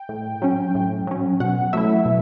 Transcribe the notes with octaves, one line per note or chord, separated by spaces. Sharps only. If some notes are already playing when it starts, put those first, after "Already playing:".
Already playing: G5
A2
F#3 C#4
A2
F#3 C#4
B2 F#5
F#3 A3 E4 E5
B2